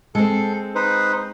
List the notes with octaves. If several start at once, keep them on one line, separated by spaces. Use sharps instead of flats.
G#3 C4 A4
D#4 B4 C5